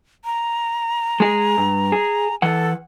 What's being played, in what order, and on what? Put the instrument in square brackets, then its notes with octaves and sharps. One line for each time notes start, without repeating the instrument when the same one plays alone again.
[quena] A#5
[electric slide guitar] G#3 G#4
G2
G#4
[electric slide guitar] E3 F#5 [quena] A4